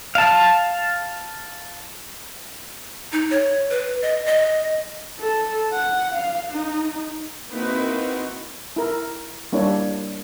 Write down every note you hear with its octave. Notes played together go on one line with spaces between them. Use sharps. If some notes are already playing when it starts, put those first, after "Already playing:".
F5 A5
D#4
C#5
B4
D#5
D#5
A4
F#5
F5
D#4
A#3 C4 D#4 E4 F#4 B4
E4 A#4
G3 A#3 D4 E4 C#5